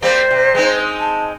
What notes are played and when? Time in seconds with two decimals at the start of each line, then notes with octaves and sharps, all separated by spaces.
0.02 G3 A#3 C4 C5
0.31 C3
0.55 G#3 C4 D#4
1.00 A5